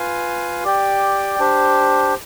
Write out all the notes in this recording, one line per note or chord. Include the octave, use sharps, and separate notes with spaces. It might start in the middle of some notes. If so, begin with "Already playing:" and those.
Already playing: F4 B4 F5 G#5
G4 D5 G5
D4 G4 C5